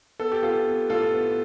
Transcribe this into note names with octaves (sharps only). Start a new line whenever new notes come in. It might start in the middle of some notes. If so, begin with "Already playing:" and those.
B3 A4
G4
B3 F4 A4
B3
A2 F4 A4
B3